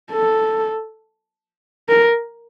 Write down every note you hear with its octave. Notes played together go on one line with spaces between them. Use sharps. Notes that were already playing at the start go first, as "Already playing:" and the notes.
A4
A#4